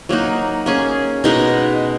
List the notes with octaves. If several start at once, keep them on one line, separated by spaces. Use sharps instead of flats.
F#3 A#3 D#4 F#4
A#3 C#4 G#4
B2 G#3 D#4 A#4